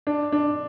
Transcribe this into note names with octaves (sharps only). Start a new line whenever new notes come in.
D4
D4